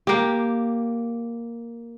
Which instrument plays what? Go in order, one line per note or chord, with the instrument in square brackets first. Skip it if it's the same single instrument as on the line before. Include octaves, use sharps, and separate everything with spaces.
[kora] A#3 G4